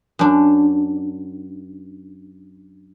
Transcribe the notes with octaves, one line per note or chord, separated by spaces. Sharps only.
F#2 D4